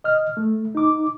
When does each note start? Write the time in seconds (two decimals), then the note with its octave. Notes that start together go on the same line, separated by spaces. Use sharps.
0.04 D#5 F6
0.37 A3
0.75 D#4 D6